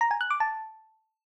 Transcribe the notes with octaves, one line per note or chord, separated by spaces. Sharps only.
A#5
G#5
F#6
D6
A5